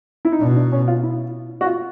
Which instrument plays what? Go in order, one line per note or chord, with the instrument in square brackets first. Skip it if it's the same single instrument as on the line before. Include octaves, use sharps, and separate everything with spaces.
[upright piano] E4
D#4
[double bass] B2 [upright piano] D4
[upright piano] D4
C#4
F4
E4
F#4
F4